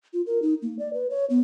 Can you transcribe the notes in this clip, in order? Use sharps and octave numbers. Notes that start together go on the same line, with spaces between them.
F4
A#4
D#4
A#3
D5
B4
C#5
B3